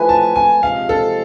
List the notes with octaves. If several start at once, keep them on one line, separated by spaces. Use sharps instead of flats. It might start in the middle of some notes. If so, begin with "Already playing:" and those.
Already playing: F3 A3 E4 B4 G#5
A5
G#5
C3 F3 G#3 F5
A4